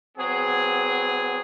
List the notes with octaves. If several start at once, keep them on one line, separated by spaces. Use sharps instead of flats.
F#3 B3 C4 G#4